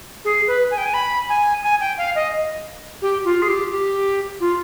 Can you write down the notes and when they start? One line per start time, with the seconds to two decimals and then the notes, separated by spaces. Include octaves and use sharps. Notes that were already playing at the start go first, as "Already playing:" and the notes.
0.24 G#4
0.47 B4
0.70 G#5
0.77 G5
0.85 G#5
0.93 B5
1.29 G#5
1.63 G#5
1.80 G5
1.97 F5
2.15 D#5
3.01 G4
3.24 F4
3.42 G#4
3.48 G4
3.71 G4
4.40 F4